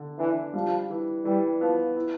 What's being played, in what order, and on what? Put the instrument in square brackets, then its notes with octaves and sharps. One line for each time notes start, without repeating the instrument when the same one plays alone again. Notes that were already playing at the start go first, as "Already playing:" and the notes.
Already playing: [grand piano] D3
[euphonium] E3 [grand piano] D4
[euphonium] F3 [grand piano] G3
[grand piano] E3
[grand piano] E3 [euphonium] G3
[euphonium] F3 [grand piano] B3
[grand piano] E4